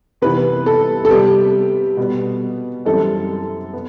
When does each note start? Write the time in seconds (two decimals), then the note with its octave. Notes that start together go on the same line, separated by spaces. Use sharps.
0.22 C3 E3 B3 B4
0.66 A4
1.05 A4
1.10 C3 G3 B3 G4
1.97 B2 G3 B3
2.86 F#2 E3 G3 C4 A4
3.73 B3